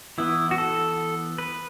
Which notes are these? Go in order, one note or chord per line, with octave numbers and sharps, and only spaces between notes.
E3 B3 E4
F#4
A4
B4